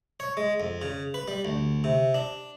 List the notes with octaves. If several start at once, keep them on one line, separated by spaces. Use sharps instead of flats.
C#5
G#3
F2
C#3
B4
G3
D2
C3
D4